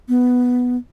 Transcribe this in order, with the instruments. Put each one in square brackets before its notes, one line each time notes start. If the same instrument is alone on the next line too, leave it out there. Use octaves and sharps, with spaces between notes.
[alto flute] B3